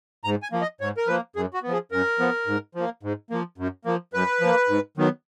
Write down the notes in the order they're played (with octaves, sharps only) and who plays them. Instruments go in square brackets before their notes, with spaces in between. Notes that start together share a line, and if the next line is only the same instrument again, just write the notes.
[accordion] G#2 A#5
G#5
F3 A#3
D#5
G#2 C#5
A#4
F3 A#3 B4
F#2 G#4
F#4
B3
F3 G#4
F#2 A#4
F3 B3
G#2
F3 A#3
G#2
F3 A#3
F#2
F3 A#3
F#2 B4
F3 A#3
G#2
D#3 F#3 B3